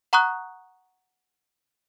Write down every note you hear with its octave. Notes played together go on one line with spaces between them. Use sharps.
F#5 A#5 C#6 D#6 F#6